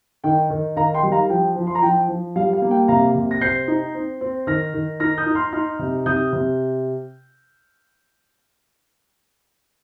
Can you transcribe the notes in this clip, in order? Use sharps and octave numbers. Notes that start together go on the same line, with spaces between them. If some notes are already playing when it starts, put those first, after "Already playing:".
D#3 G5
D#3
D#3 F5 A#5
G5 C6
G3
F5 A#5
F3 G5
F3
C6
A#5
F3 G5
F3
G3 F5
F5
A#3
G5
C3 F5 A#5
C3
A#6
C4 G6 C7
D#4
C4
C4
D#3 F6 A#6
D#3
D#4 F6 A#6
D#6 G6
D#4
C6 F6
D#4 C6 F6
C3
C3 D#6 G6
C3